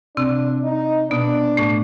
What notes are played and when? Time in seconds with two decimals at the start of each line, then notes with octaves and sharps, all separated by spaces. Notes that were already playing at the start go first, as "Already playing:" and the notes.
0.17 C3 C4 D4
0.64 D#4
1.11 B2 B3 D4
1.57 A2 A3